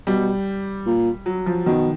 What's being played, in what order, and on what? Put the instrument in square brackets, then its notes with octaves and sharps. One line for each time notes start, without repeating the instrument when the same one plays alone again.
[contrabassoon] B2 [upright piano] G3
[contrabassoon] A#2
[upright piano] F#3
F3
[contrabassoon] B2 [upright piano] D#3